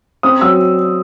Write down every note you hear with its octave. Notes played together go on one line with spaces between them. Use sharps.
C4 D#6
F#3 E6